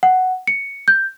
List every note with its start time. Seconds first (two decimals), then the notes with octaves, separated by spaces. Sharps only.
0.03 F#5
0.47 C#7
0.88 G6